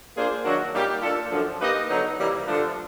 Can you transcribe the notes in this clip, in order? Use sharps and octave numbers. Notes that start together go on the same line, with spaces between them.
A#3 D4 F4 G#4 C5
D#3 F#3 A#3 D4 F#4
A#2 G3 A#3 D#4 G4
A#3 D4 F4 A4
F#2 D3 F3
A#3 D#4 G4 B4 D#5
D3 F#3 B3 D#4
C3 E3 G3 A#3
G2 D3 F3 A3 D4